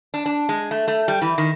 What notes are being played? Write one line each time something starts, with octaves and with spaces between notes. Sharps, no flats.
D4
D4
G#3
A3
A3
G3
E3
D#3